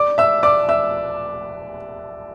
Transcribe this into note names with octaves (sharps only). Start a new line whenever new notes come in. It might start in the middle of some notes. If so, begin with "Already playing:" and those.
Already playing: D5 D6
E5 E6
D5 D6
E5 E6